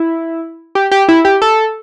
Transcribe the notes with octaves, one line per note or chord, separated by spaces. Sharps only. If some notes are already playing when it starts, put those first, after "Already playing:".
Already playing: E4
G4
G4
E4
G4
A4